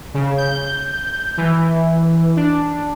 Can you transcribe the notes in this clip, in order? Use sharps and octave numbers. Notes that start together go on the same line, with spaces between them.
C#3
G6
E3
D4